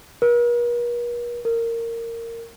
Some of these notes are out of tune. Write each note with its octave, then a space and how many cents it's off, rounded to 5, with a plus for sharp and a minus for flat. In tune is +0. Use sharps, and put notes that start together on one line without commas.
A#4 +45
A#4 -15